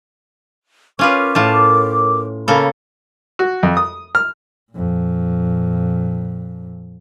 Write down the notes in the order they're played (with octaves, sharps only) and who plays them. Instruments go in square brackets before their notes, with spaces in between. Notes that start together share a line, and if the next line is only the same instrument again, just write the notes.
[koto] C#4 F4 B4 [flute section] A#4 D6
[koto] A2 F4 A5
[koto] C#3 A#3 A4 [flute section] B5
[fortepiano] F#4
F2
D#6
F6
[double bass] F2 A#2